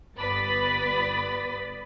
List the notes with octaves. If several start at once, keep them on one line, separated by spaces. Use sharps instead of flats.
G1 B3 B4 D5 B5 A6